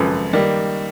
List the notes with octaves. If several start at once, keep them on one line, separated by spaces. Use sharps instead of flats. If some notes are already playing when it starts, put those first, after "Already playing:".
Already playing: G#1 F#2 C#3 F3 A4 B4
D#3 G3 A#3